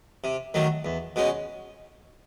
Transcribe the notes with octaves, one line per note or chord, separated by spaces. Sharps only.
C3
D#3 F#3 A3
E2
B2 G#3 C#4